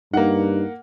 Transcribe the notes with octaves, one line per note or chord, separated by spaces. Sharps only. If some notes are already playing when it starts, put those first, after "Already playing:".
G2 A#3 D#4 F#5